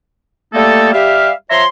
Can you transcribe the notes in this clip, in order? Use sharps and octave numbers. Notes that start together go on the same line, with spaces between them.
G3 A3 A#3 D#4 A4
G3 G4 E5 F5
F3 C#5 E5 A#5 C6